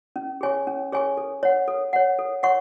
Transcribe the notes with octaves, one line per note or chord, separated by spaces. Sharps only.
C#4
G#4 C#5 G#5 C#6
C#4
G#4 C#5 G#5 C#6
A4
C#5 F#5
A4
C#5 F#5
A4
C#5 F#5 C#6